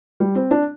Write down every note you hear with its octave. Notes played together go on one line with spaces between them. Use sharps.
G3
C4
D4